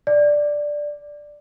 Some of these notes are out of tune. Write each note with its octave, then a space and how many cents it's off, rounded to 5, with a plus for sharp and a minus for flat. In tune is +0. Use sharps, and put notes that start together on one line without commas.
D5 +5